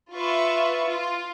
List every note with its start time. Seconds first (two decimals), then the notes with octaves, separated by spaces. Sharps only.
0.14 F4 B4 E5 C#6
0.86 F4